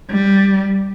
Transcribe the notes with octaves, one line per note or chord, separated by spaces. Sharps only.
G3